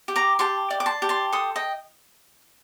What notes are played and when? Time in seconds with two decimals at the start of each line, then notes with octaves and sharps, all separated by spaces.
0.08 G4
0.16 A#5 D6
0.39 G4 A5 C6
0.70 D5
0.80 D6
0.86 A5 C6
1.02 G4
1.09 A5 C6
1.33 A4 C6 D#6
1.56 D#5 G5